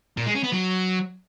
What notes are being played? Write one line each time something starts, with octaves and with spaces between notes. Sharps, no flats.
A#2
G#3
C#4
B3
F#3